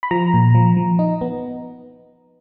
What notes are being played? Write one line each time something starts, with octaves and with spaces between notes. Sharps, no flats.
B5
F3 A#5
A#2
F3
F3
D#4
B3